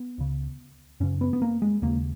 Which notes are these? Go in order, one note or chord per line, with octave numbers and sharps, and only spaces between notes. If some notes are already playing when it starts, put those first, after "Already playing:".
Already playing: B3
C#2 C#3
F#2 C#3 C#4
B3
B3
A#3
G#3
D#2 C#3 A#3